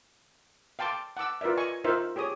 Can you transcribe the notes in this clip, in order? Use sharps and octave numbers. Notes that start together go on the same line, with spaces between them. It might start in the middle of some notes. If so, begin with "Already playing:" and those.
F5 G5 A5 C6 D6
F#5 A5 D6 E6
F4 A#4 B4 D5 E5
D#5 G#5 C#6
D#4 F4 A#4 C5 E5
G4 G#4 C#5 D#6